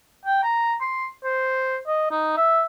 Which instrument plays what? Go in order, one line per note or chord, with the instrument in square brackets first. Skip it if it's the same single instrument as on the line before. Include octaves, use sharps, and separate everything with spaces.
[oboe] G5
A#5
C6
C5
D#5
D#4
E5